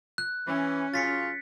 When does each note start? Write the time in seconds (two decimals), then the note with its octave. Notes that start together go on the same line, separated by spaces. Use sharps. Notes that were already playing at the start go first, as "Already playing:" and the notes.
0.18 F#6
0.47 E3 C#4
0.94 C#3 F#3 F4 A6 B6 C#7